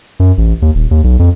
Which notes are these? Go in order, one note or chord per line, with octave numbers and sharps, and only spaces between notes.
F#2
A1
D#2
D#1
D#2
B1
F2